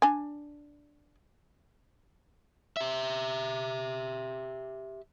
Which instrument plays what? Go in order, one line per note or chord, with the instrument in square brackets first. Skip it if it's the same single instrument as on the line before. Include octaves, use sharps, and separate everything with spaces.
[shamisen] D4 G#5
[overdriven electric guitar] G4 E5